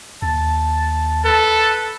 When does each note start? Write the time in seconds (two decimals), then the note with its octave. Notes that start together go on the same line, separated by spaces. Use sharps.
0.22 D#2 A5
1.25 A4 B4